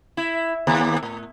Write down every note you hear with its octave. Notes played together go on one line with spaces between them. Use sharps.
E4
D#2
A2